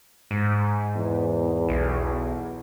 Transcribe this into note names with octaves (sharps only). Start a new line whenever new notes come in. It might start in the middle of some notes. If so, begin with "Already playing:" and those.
G#2
E2
B1